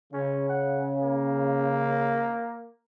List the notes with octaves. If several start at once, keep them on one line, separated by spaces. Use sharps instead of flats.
C#3 C#4
F#5
A#3